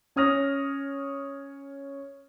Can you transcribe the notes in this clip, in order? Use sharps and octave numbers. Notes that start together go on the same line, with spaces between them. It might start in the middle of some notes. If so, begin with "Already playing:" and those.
C#4 C#5 D#6 F6 A#6